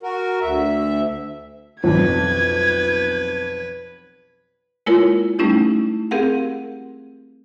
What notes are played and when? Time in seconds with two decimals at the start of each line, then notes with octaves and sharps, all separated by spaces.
0.03 F#4 A#4
0.42 D2 E5
1.84 B1 F2 B4 G#6
4.86 G#3 A#3 E4 F4 A#4 C#5
5.39 G3 A3 C#4 D#4 E4 G4
6.11 C4 G4 G#4 A#4 F5 F#5